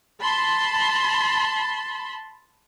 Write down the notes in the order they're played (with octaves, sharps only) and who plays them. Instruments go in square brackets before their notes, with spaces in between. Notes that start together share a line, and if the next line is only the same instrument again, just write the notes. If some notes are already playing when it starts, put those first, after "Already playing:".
[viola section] A5 B5 C6